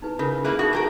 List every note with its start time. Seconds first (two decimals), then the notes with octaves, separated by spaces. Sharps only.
0.02 D#4 E4 B4
0.19 C#3 F4 A#4 B4
0.44 A#3 E4 G#4 A#4 B4
0.59 D#4 F#4 G#4 D#6
0.73 G4 A4 A#4